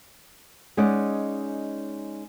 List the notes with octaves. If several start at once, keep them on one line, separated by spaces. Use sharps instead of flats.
G#3 C#4 D#4 D5 D#5 F#5